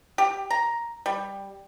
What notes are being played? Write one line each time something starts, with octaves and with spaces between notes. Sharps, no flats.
G4
A#5
G3